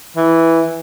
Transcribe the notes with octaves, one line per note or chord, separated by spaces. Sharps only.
E3